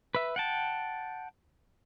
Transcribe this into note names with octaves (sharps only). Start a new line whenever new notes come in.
B4 E5
F#5 G5 A5